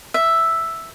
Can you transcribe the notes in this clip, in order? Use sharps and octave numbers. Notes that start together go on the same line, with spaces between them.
E5